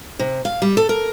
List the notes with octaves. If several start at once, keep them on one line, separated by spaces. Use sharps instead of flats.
C3
F5
G3
A4
A#4